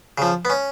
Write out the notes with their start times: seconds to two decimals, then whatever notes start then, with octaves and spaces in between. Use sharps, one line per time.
0.18 C#3 F3
0.45 B3
0.50 C#4